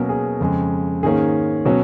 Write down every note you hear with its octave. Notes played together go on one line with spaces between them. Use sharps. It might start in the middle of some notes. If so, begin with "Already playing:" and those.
Already playing: B2 F#3 A#3 C#4 A#4
G#4
F2 C#3 G#3
G#2 D#3 A#3 C#4 G#4
B2 F#3 C#4